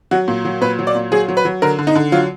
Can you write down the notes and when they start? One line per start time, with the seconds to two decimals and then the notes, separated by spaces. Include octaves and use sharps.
0.11 F#3 F#4
0.28 A#2
0.45 F#3
0.61 A#2 B4
0.79 F#3
0.87 D5
0.95 A#2
1.12 F#3 G#4
1.28 F#3
1.37 B4
1.45 F#3
1.62 D3 A#4
1.79 D3
1.87 D#4
1.95 D3
2.12 F#3 F4